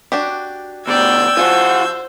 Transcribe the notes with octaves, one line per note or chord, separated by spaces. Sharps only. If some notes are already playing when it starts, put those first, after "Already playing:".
D4 F#4 G4
D2 B2 D5 G5 E6 G6 G#6
F3 F4 F#4 C5 F#5 G#5